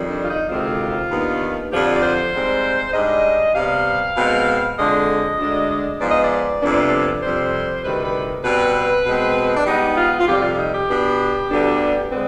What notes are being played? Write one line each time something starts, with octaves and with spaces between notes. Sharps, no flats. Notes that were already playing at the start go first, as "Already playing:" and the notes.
Already playing: F2 D#3 G3
D4
F4
D#4
D2 C3 D#3 G#3 C4 F4
D#2 D#3 B3 D4
F2 D3 F3 G4
D5
C5
G#2 G3 C4
G#2 G3 D4 D#5
C3 G3 B3 F5
B2 G#3 C4
F2 D3 G#3 D4 D#5
D2 D3 G#3 D4
G#2 F3 B3 D5
D#5
D5
F2 C3 G3 B3 D4
F2 C3 G3 C5
D2 C3 D#3 G3 B4
B4
B2 G3 C4 B4
B2 G#3 C4
D4
G#2 G3 B3 D#4
F4
F4
F2 C3 G3 G4
F4
D#4
G4
B2 B3 D4
D2 D3 G3 B3 D4
D3 G#3 C4 B4